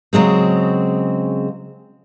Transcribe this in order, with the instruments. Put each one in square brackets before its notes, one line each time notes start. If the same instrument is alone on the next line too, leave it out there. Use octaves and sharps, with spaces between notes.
[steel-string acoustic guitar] C#3 F#3 G#3 C4